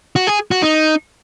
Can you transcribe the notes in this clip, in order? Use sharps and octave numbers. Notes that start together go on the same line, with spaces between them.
F#4
G#4
F#4
D#4